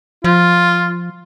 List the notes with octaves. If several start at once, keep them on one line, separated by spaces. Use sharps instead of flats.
F3 F4